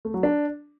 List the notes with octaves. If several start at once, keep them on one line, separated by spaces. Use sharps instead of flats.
A3
F#3
D4